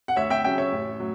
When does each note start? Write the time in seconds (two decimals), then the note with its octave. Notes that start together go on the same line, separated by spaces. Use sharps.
0.08 F#5
0.16 D2 C#5 E5
0.30 E5 G5
0.44 C#3 F#3 C#4 E5 G5
0.58 C#5 E5
0.72 A1
1.00 A2 F#3